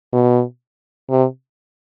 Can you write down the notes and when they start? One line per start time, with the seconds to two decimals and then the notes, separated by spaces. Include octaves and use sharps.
0.13 B2
1.10 C3